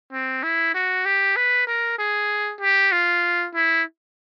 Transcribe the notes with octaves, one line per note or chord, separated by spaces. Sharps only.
C4
E4
F#4
G4
B4
A#4
G#4
G4
F4
E4